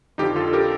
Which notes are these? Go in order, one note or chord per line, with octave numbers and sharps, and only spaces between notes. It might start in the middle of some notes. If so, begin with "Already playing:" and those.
F2 D3 F3 D#4 G4
F4 A4
G4 A#4